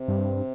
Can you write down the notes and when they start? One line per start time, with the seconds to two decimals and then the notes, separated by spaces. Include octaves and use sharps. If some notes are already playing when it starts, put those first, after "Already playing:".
Already playing: C3
0.08 G2